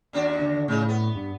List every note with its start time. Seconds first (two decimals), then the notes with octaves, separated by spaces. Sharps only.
0.13 D#2 D4 F#4
0.39 D3
0.68 A2 C#3 D#4
0.89 B3
1.15 G2